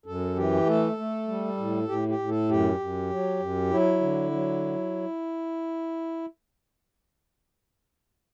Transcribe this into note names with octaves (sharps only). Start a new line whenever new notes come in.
F#2 A4
E3 G4
A3 A4
A3
G3
A2
A2 G4
G4
A2
A4
F#2 G4
F#2
F#3
F#2
F#3 E4
D3
F#3